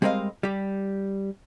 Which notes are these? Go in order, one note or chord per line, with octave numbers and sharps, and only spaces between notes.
G3 G#3 C4 A#4 D#5 F5
G3 G4